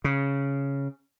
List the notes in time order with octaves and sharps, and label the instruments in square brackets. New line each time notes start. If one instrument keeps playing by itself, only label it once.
[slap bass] C#3